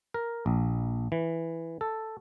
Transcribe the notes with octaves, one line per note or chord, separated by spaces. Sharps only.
A#4
A#1
E3
A4